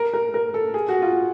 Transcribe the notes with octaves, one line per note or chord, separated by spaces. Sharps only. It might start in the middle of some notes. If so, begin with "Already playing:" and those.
Already playing: A#4
A#4
A#4
A4
G#4
F#4
F4